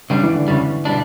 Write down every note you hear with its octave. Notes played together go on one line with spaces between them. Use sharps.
C#3 G3 D4
E3
D3
E2 C#3 G3
B2 G3 D4